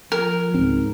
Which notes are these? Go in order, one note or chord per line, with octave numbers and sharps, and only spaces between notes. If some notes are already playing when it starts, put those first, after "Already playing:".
F3 A#4
C#2 G#2 C4